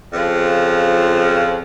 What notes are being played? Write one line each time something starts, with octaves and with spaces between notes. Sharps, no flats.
F2 C#3 F3